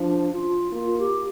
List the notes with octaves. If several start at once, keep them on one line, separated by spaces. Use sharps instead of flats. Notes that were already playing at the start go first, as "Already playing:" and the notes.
Already playing: F3 D4
F4
A#3 F4
G4